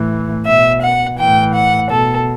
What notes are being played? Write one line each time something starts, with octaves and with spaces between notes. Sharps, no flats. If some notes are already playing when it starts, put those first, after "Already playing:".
Already playing: A2 E3
B2 E5
F#5
A2 E3 G5
F#5
B2 A4